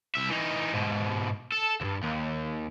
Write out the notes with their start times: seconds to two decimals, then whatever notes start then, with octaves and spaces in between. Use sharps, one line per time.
0.15 C2 E5
0.29 E3 D#4
0.72 G#2 B2
1.52 A4
1.81 D2 G2
2.03 D#2